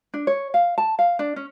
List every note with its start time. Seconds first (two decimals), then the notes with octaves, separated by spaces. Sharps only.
0.14 D4
0.27 C#5
0.54 F5
0.78 A5
0.99 F5
1.19 D4
1.36 C#4